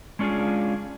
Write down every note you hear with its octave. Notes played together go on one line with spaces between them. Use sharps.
G#3 C#4 D4 F4 G#4